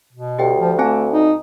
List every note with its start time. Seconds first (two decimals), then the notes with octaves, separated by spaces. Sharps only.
0.13 B2
0.39 D2 G4 G5
0.60 F3
0.79 A3 C4 G#5 A5
1.12 D#4